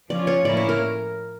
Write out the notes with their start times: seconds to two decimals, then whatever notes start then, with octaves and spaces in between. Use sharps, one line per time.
0.09 F3 C#4 F4 D5
0.27 C#5
0.45 A2 F3 A#3 C#4 E4 D5
0.57 C#5
0.69 A#4